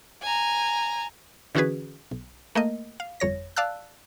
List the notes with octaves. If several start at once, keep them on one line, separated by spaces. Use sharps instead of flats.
G#5 A#5
D3 E3 C#4 F#4 G#4 B4
B1
A3 A#3 A#4 D#5
F5
G1 F2 C#5 A#6
D5 F5 A5 E6 F#6